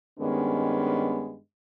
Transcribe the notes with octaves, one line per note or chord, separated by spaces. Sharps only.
G2 D#3 G#3 B3 C#4